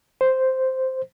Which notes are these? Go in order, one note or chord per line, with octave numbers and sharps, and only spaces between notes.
C5